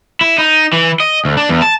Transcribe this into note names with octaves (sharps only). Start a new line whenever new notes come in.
E4
D#4
E3
D#5
D2
D4
E2
A5